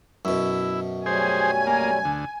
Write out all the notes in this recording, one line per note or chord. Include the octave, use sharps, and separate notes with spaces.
F#2 B2 E4
F#3 G3 A3 G#4 C5 G#5
A#3
D2